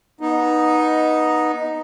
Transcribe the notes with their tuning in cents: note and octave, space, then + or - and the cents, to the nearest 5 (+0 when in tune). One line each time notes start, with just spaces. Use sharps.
B3 -20 D#4 +0